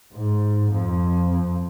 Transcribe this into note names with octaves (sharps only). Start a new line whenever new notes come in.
G#2
F2
F2